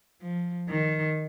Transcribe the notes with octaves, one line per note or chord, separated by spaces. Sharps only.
F3
D#3